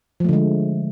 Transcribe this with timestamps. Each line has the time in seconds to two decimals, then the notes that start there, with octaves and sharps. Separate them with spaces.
0.20 F3
0.24 A3
0.29 D3
0.33 G#3